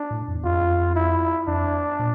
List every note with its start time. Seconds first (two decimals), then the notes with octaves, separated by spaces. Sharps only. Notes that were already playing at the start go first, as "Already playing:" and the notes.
Already playing: D4
0.11 A2
0.28 F2
0.36 E2
0.44 F2 F4
0.96 E4
1.47 F2 D4
1.99 A#2